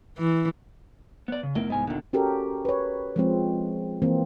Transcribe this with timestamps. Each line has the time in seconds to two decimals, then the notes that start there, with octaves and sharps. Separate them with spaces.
0.18 E3
1.28 B3 D5
1.43 C#3
1.55 F1 A3 B3 E4 A#4 D#5
1.70 C2 G#2 B3 G#5
1.87 D#1 D3 D#3 A#3 B3
2.13 C#4 F#4 G4 A4 A#4
2.65 B4 C#5
3.16 F3 G#3 C4
4.02 E3 A#3 C4